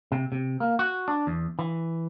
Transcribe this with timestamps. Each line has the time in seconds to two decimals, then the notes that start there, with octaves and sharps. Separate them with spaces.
0.12 C3
0.32 C3
0.60 A#3
0.79 F#4
1.08 D4
1.27 E2
1.59 E3